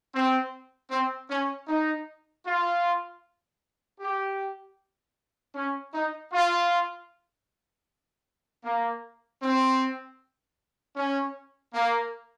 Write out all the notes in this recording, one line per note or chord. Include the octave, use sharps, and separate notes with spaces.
C4
C4
C#4
D#4
F4
G4
C#4
D#4
F4
A#3
C4
C#4
A#3